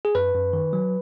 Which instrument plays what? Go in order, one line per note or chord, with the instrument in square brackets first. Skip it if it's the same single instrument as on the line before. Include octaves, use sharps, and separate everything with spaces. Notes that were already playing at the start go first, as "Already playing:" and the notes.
[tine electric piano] G#4
F#2 B4
F#2
D#3
F#3